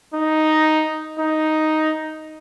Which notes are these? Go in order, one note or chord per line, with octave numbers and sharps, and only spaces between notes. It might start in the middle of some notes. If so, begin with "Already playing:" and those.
D#4
D#4